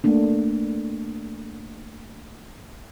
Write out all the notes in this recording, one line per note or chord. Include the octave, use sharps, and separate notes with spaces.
A3 A#3 D4